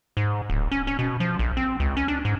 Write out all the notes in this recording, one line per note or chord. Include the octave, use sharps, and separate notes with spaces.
G#2
D1
C#4
C#4
B2
F3
A#1
C4
C#2
C#4
D4
G#2